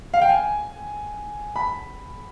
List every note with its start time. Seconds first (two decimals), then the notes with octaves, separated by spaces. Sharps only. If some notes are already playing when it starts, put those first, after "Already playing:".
0.14 F5
0.21 G5
0.29 G#5
1.56 B5